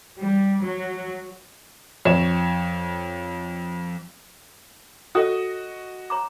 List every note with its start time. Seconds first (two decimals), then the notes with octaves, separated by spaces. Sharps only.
0.17 G3
0.62 F#3
2.05 F2 C#5 E7
5.15 F#4 A4 C#5 D#5 D#6
6.10 C#5 A#5 D6